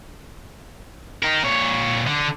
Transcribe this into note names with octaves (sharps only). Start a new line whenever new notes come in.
D#4 A#4
A#2 C#5
D3